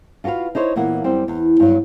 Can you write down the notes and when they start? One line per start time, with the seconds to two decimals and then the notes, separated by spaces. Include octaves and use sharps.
0.24 F4 F#4 A#4 B4 F5
0.55 D#4 E4 C5 C#5
0.76 A#2 E3 A#3 B3 F#5
1.04 F#2 G3 C4
1.28 E2
1.60 G2 F#3